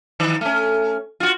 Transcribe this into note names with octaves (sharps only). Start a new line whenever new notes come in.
D#3
A3 C#4
F4 F#4